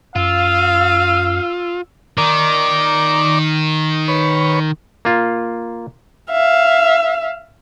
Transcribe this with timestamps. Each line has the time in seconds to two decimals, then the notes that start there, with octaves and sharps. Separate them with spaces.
0.16 F#2 F4 F5 E6
2.18 D#3 D5 A#5 D6
4.08 B4 C#5
5.05 A#3 F4
6.31 E5 F5